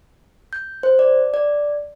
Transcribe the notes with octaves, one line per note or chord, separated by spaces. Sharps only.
G6
C5
D5
D5